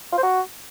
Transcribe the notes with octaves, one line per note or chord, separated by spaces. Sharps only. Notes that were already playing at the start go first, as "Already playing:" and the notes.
F4
C5
F#4